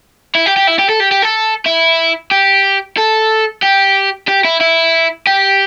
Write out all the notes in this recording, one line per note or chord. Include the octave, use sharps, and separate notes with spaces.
E4
G4
G4
E4
G4
A4
G4
G4
A4
E4
G4
A4
G4
G4
E4
E4
G4